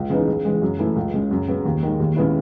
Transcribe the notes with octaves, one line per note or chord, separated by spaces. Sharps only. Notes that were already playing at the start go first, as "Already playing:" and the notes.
Already playing: C#2
C#3 E3 B3 D#4
C#3
E3 G#3
F#2
E3 A3 E4
C#2
C#3 G#3
F#2
C#3 F#3 B3
D#2
D#3 G#3
D#2
C#3 G#3 B3 E4